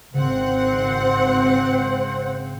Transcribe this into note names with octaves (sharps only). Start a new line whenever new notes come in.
G#1 C#3 C4 C5 F#5